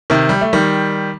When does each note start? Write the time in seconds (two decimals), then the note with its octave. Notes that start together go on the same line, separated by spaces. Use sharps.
0.10 C3 D#3
0.29 G3
0.41 A3
0.53 D#3 G3